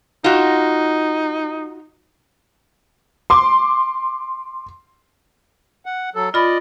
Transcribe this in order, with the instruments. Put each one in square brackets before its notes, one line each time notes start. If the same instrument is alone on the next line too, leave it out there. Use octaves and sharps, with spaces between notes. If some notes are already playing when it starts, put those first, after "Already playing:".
[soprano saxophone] D#4 [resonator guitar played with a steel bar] F4 F#4
[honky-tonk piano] C6 D6
[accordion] F#5
F#3 A4
[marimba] F4 B5 [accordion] D5 D#5